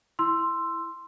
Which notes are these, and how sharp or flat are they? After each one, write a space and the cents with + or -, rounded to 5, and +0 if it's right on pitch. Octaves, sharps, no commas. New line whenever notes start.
E4 +0 C6 +0 E6 +15